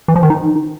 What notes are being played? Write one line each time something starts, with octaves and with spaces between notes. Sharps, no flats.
E3
F3
D#3
D#4